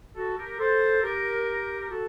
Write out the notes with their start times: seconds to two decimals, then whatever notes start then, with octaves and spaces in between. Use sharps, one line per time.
0.16 F#4 A4
0.37 G4 A#4
0.59 A4 C5
1.03 G4 A#4
1.80 A#4
1.89 F#4 A4